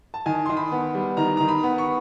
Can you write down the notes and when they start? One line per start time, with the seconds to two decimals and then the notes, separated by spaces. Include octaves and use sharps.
0.14 A5
0.26 D#3 G#5
0.46 D#3 C6
0.57 B5
0.72 B3
0.94 G3
1.17 D#3 A#5
1.37 D#3 A#5
1.48 B5
1.63 B3
1.78 C#6